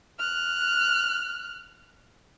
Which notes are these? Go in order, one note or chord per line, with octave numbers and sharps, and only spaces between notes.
F6 F#6